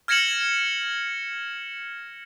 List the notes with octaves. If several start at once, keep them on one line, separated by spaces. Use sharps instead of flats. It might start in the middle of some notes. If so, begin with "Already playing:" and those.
F6 G#6 A#6 C#7 E7 F#7